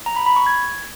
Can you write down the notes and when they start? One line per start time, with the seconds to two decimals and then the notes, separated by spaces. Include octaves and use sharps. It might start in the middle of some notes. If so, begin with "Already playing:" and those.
0.06 A#5
0.16 B5
0.26 B5
0.36 C#6
0.47 G#6